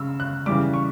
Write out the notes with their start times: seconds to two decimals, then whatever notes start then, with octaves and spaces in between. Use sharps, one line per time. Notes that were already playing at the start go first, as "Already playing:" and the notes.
Already playing: C#3 E6
0.20 F#6
0.46 C#3 E3 G3 D6
0.74 C#6